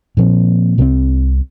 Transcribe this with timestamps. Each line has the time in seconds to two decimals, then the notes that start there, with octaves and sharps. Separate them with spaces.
0.17 A#2 F3 C4
0.78 C2 C3 G3 C4